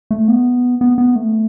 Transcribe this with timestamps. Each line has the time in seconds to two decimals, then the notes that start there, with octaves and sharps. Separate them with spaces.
0.11 A3
0.28 B3
0.81 B3
0.98 B3
1.16 A3